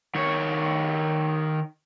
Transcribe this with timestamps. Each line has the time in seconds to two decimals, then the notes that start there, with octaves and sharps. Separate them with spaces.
0.15 D#3 C#5